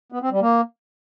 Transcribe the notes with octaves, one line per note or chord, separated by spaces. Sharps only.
B3
C4
G3
A#3